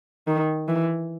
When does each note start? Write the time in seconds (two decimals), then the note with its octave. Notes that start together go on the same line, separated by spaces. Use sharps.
0.28 D#3
0.68 E3